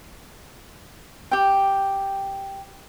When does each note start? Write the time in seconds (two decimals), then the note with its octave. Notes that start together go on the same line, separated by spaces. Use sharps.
1.31 G4 G5